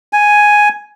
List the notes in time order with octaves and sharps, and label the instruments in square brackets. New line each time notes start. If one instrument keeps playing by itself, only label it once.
[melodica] G#5